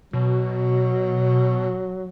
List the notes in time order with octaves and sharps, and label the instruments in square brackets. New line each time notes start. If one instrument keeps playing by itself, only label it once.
[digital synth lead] B2 [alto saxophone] F#3